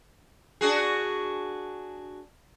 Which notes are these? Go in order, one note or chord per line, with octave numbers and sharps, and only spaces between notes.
D4 F#4 G#4